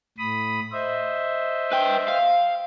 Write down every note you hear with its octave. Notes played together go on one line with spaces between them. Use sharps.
A2 B5 D#6
C5 D#5 E5
B4 G5
F5